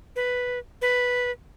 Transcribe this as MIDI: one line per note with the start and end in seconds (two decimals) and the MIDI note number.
0.16 0.59 71
0.82 1.31 71